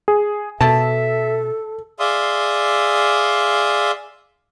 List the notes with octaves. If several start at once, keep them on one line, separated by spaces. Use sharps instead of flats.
G#4
B2 A4 E5 A5
G#4 D5 E5 F5 C6 D#6